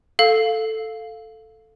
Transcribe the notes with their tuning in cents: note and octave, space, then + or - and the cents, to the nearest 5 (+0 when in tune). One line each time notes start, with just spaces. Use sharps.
A4 +0 F5 +5